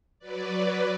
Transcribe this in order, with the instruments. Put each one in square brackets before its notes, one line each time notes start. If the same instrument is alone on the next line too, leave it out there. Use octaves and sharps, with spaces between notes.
[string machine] F#3 B4 D5